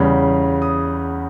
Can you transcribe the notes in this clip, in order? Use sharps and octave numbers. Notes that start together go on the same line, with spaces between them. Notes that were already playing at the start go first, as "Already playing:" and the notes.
Already playing: E2 C#3 G3 B5
D#6